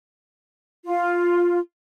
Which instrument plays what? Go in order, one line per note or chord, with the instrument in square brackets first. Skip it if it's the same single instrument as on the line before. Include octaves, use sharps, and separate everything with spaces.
[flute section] F4